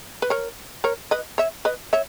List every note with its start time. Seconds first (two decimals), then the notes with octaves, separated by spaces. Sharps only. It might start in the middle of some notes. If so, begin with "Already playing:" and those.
0.22 B4
0.30 A#4 C#5
0.84 A#4 C#5
1.11 B4 D#5
1.38 C#5 E5
1.65 B4 D#5
1.93 C#5 E5